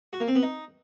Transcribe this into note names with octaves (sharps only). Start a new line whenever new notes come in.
F#4
A#3
C4
B3
D#4